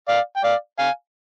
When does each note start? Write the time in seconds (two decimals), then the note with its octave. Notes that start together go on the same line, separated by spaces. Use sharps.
0.08 D5 F5
0.37 G5
0.44 D5 F5
0.79 F5 G#5